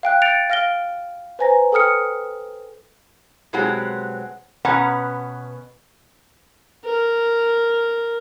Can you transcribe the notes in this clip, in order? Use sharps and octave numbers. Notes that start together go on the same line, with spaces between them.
F5 G5 F#6
G6 A6 C#7 D7 F7
F5 F6 A#6 D7 G7
B4 C5 G#5 A#5 A#6
A4 G5 D#6 F6 C#7
B2 F#3 G#3 C4 F#4 G4
B2 B3 C#4 F#5 A#5
A#4